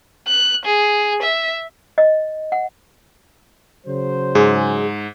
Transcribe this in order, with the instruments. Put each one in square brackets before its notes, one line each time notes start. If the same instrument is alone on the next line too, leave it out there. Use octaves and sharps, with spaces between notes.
[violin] F#6
G#4
E5
[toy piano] D#5
F#5
[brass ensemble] C#3 F#3 C5
[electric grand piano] G#2 [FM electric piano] G#4